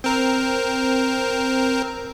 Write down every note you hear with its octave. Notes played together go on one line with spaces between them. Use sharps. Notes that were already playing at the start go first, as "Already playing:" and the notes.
C4 A#4